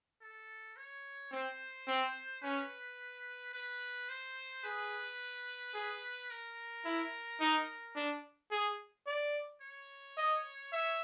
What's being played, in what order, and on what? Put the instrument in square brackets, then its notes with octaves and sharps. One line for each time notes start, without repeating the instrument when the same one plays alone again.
[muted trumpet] A4
C#5
[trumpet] C4 [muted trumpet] C5
[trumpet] C4
[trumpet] C#4 [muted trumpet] B4
[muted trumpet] B4
C5
[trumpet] G#4 [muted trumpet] B4
[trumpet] G#4
[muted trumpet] A#4
[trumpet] E4
D#4
D4
G#4
D5
[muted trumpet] C#5
[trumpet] D#5
E5